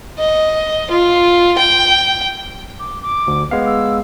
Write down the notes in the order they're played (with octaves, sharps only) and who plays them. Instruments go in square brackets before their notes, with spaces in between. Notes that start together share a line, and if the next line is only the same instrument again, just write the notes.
[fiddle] D#5
F4
G5
[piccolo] D6
D6
[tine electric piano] D2
G#3 B3 F5
[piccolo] E6